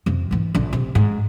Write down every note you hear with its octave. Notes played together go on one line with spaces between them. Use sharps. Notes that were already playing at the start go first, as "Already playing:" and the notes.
F2 C3
G#2 E3
A#1 D3
C3
G#2